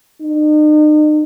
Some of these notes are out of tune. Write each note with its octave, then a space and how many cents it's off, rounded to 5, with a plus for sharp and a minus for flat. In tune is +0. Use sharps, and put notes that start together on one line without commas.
D#4 -40